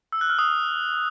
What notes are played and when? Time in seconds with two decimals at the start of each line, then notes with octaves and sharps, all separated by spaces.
0.12 E6
0.21 F#6
0.30 F6
0.39 D#6